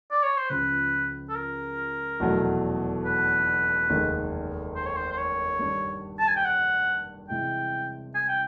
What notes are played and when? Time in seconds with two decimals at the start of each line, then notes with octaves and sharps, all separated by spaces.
0.11 D5
0.23 C#5
0.38 C5
0.50 C#2 C#3 F3 B4
1.29 A4
1.36 A#4
2.20 F1 E2 B2 F#3 A3
3.05 B4
3.90 F1 D#2 D#3 G#3
4.75 C5
4.86 C#5
4.96 C5
5.12 C5
5.17 C#5
5.59 G2 D#3 G3
6.19 A5
6.28 G#5
6.36 G5
6.45 F#5
7.29 C3 E3 G#3 G5
8.15 G#5
8.28 G5